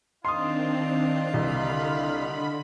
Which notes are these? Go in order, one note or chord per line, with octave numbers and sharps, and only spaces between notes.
D#3 C4 D4 F4 D#5 F5 C6 D#6
C2 D3 B5